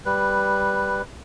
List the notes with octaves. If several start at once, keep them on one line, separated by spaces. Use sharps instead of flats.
G3 B4